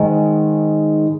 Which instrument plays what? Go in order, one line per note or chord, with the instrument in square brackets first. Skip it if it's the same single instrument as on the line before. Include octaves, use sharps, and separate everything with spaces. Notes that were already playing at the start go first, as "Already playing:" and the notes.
Already playing: [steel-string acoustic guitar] G#2 D#3 G#3